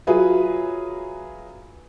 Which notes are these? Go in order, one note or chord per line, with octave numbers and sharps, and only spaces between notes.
F#3 F4 G#4 B4 E5